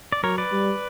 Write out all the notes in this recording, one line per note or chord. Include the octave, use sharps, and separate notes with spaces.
D5
F#3 A#4 C#5
B4 D5
G3